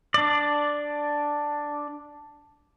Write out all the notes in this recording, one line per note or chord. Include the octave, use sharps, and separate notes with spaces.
D4 D5